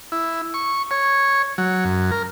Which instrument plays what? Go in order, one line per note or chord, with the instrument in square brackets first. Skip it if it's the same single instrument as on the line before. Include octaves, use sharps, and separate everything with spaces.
[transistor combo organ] E4
C#6
C#5
F#3
F#2
A#4